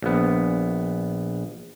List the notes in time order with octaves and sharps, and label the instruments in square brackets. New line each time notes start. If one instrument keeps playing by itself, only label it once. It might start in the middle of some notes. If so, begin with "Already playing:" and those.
[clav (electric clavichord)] A#1 B3